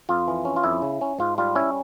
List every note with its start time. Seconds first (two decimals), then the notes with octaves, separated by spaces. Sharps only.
0.09 F2 F4
0.28 E3
0.45 C#4
0.56 F4
0.63 F2 E4
0.82 C#3
1.01 C#4
1.19 G#2 F4
1.38 G3 F4
1.55 C#4 E4